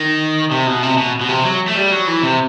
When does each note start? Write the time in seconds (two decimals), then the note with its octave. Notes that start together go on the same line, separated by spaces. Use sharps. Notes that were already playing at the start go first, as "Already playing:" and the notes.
Already playing: D#3
0.51 C3
0.67 B2
0.83 C3
0.97 B2
1.21 B2
1.29 C3
1.45 F#3
1.68 A3
1.76 G3
1.91 F#3
2.07 E3
2.23 C3